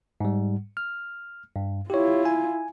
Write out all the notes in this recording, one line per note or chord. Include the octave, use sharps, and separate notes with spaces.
G#2 G3
F6
G2
E4 F4 G4 C#5
G#5